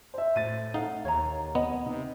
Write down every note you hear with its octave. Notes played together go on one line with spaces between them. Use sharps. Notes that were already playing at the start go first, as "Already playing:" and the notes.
C5 E5
A2 A6 D#7
D#4 A4 F5 F#5
D#2 C#5 A#5
B3 D#5
C3 D#4